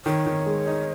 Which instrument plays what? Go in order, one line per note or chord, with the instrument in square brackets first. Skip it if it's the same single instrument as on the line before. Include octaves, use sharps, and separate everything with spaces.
[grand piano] D#3 [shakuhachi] C#5
[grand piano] D#3
G#3
D#4